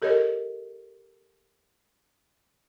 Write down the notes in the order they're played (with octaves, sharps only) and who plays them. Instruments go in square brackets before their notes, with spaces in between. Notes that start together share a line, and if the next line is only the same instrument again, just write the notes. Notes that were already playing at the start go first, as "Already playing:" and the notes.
[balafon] G4 A4 A#4 C#5 D#5